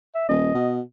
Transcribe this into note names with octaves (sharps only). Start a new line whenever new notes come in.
E5
D#1 D#5
B2